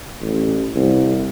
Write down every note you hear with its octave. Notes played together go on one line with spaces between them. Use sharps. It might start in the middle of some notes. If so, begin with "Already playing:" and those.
A1
C2